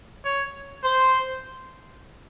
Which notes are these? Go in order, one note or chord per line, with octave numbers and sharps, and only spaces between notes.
C#5
C5